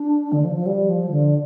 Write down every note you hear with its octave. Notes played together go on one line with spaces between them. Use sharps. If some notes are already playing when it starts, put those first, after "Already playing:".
Already playing: D4
D3
F3
F3
G3
F3
D3